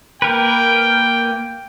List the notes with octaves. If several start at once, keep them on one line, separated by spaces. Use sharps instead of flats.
A#3 A#4 B4 G5